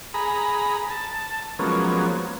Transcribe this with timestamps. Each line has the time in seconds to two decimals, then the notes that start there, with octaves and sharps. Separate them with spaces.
0.14 G#4 A#5 B5
0.90 A5
1.59 F3 F#3 G#3 A#3 B3 C#4